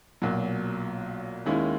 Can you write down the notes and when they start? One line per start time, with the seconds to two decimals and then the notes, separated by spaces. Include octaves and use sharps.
0.22 B1 A#2 F#3
1.46 D#2 D#3 G#3 C#4 E4